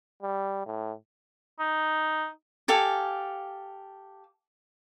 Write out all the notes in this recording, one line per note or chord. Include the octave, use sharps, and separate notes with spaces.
G3
A2
D#4
G4 A4 F5 G#5